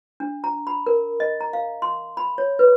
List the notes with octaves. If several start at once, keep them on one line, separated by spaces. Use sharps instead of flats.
D4
A#5
B5
A#4
D#5
A#5
F5
C6
B5
C#5
B4